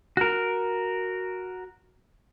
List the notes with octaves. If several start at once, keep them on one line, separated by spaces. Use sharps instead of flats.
F#4 A#4